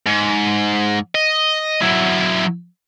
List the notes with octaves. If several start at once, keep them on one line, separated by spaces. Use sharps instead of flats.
G#2
D#5
F#3 E4